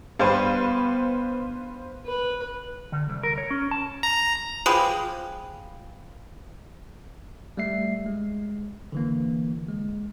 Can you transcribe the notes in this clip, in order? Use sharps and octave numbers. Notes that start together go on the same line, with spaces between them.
G2 B3 B4 C5 F5
B4
D3
C2
A#4
C#5
C#4
A5
A#5
F3 G4 G#4 B4
G3 A3 E5 C7
G#3
D3 E3 A#3
G#3